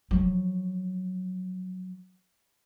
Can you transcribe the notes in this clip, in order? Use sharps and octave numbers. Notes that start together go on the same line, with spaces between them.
F3 F#3